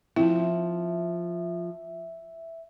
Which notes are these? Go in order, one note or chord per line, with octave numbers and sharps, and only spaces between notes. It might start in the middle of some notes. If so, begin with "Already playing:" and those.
F3 C4 E4 E5